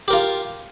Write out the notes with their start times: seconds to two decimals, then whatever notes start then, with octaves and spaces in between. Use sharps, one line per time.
0.08 G4
0.10 A#4
0.13 F4